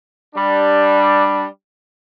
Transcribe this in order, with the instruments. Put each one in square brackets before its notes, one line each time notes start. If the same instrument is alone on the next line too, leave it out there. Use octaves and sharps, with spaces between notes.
[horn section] G3 D4